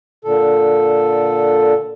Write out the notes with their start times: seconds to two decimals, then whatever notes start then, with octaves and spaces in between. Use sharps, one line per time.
0.25 A#2 D3 A4